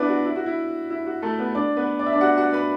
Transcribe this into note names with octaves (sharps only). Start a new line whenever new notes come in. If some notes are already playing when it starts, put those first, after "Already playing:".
Already playing: B3 D4 E4 B4 D5
F#4
E4
F#4
E4
E4
F#4
A3 A4
B3 B4
D4 D5
B3 B4
D5
E5
D4 D5
F#4 F#5
F#4 F#5
B4 B5